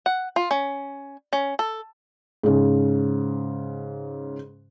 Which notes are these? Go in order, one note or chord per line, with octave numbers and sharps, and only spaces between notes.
F#5
F4
C#4
C#4
A4
G#2 C#3